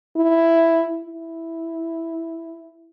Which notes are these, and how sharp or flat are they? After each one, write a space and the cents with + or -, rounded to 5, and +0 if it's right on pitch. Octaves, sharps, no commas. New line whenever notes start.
E4 +5
E4 +0